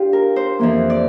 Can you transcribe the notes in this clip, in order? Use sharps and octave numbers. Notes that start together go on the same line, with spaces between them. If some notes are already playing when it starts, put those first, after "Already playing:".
Already playing: D4 F4 G4
A#4
C5
F2 E3 A#3
D5